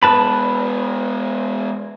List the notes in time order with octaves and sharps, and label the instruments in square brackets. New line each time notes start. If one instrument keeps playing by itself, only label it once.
[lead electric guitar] G#3 B3 [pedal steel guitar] B4 A5 B5